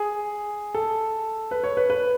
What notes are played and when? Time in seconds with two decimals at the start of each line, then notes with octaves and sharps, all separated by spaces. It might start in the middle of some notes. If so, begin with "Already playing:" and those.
Already playing: G#4
0.75 A4
1.51 B4
1.64 C#5
1.77 B4
1.90 B4